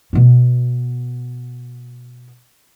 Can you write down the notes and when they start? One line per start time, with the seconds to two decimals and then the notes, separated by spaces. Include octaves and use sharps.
0.13 B2 B3